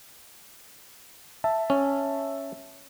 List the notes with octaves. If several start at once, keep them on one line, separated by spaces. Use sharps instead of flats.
E5 A5
C#4